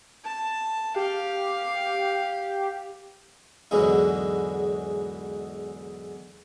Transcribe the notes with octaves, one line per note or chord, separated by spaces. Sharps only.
A5
G4 F5
E2 G#2 D3 F#3 G#3 E4